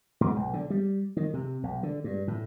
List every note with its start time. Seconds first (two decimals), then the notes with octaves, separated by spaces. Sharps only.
0.21 G#2
0.36 B1
0.53 D3
0.70 G3
1.17 D#3
1.34 C3
1.63 B1
1.83 D3
2.04 G2
2.28 A2